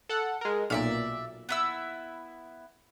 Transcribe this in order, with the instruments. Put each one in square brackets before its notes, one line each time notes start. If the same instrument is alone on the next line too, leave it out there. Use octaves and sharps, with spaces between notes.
[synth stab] A4 F#5
G#3 A#4
[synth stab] B1 A#2 [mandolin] D5 E5 F5
[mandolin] B3 E4 E6